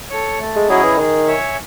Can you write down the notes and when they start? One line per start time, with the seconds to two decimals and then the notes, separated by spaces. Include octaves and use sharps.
0.10 A4 C#5
0.38 A3
0.56 G#3
0.69 F#3 C#4 E4 G#4 D#5
0.84 E3
0.98 D#3 G#4
1.27 C#5 E5 G#5